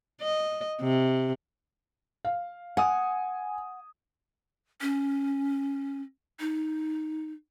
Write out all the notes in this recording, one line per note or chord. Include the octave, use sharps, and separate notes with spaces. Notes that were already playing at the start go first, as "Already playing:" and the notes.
D#5
C3
F5
F#5 G#5 D#6
C#4
D#4